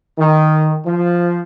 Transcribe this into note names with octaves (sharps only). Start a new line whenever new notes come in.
D#3
F3